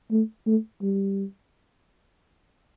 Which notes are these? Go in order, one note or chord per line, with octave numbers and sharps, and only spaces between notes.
A3
A3
G3